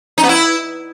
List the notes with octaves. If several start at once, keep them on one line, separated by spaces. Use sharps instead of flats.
D#4
B3
E4